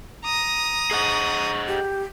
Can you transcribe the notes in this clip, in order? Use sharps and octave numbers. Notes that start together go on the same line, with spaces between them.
A#5 D#6
G#4 D#5 F#5 C#6
G4